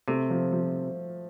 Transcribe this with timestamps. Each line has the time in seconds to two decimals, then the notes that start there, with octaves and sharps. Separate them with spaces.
0.08 C3 A3
0.30 F3
0.52 F3